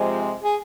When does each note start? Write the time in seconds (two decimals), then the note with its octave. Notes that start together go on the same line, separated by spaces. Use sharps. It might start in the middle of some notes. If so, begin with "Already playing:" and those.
Already playing: C3 F3 G#3
0.43 G#4